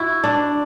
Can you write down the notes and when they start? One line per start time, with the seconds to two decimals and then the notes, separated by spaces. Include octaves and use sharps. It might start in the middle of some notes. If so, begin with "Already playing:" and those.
Already playing: E4 F#4
0.24 D4